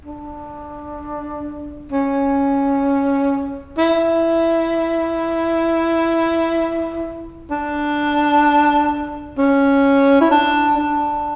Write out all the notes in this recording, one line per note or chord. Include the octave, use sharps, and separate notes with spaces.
D4
C#4
E4
D4
C#4
E4
D4
D4